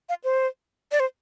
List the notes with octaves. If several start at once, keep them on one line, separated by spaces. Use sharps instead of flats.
F5
C5
D5
C5